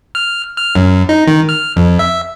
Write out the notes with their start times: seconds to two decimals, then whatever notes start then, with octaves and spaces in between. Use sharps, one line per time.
0.15 F6
0.57 F6
0.75 F#2
1.09 D#4
1.27 D#3
1.49 F6
1.76 F2
1.99 E5